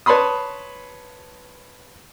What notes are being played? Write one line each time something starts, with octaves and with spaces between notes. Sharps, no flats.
B4 C#5 A5 B5 C6 D#6